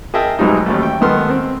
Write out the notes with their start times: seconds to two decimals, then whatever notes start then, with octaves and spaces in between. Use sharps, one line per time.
0.14 G#4 A#4 D#5 E5 G5 A5
0.39 B1 G#2 F#3 G3 D#4
0.66 A1 D#2 A3
0.83 G5
1.01 G#1 D#3 B3 A4 C6 F6
1.30 C4